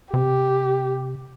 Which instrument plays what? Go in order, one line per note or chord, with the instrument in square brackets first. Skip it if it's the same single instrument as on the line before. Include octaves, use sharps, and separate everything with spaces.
[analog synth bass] C3 [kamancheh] G4